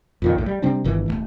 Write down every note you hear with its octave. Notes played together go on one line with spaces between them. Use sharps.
F2 A#2 D#3
A#1 A2
G3
C3 G3 C4 D4
G1 A2 D#3 E3
D#1 E2 A3